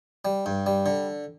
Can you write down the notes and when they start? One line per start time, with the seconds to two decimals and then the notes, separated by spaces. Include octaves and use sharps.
0.25 G3
0.46 G2
0.66 G3
0.86 D3